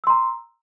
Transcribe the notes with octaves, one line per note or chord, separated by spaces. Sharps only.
A#5 C6 E6